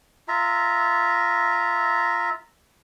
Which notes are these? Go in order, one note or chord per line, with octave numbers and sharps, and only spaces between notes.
F4 E5 A#5